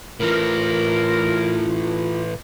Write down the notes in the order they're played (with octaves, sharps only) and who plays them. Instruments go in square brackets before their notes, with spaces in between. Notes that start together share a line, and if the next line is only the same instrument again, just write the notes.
[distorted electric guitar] A2 E3 [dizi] F4 [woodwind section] A#4